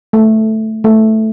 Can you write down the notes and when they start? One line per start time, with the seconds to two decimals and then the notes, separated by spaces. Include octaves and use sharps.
0.13 A3
0.84 A3